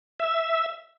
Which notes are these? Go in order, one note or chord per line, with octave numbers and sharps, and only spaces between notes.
E5